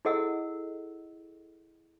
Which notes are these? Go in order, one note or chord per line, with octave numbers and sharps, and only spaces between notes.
E4 G#4 A4 D#5 F#5 E6